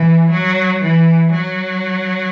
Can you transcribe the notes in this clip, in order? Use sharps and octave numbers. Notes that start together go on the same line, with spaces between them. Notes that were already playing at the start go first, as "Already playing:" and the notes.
Already playing: E3
F#3
E3
F#3